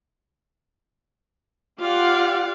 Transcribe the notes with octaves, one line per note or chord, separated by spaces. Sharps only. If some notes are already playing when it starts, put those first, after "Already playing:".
F4 G4 D5 F5 F#5